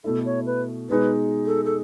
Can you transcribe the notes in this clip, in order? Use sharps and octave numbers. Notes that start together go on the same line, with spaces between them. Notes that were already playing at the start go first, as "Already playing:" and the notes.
B2 A3 E4 A4
C#5
B4
B2 G#3 D#4 G#4 B4
A4
A4